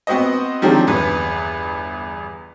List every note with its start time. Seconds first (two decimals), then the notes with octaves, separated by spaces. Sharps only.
0.07 B3 C4 F#4 C5 D#5
0.62 D#3 F3 F#3 G#3 C4 D4
0.87 G1 E2 B4